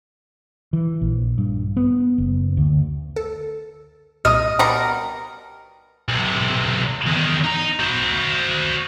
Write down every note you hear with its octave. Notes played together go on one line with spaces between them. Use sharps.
E3
A#1
G2
B3
F#1
D2
A4
C2 A#2 D#5 D#6 F6
B2 G3 A#4
B1 C3
E2 D#3
D#4 A#5
F#4 C5